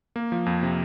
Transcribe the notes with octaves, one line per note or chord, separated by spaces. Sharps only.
A#3
F3
F2
C3